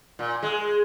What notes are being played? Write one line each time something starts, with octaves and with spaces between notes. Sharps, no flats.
A#2
G#3